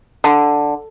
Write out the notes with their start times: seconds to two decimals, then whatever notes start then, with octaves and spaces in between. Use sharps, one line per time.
0.24 D3